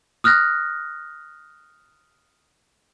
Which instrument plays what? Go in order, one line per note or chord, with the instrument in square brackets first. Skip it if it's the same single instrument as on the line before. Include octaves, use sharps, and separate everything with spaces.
[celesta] D#6 F6 F#6 A#6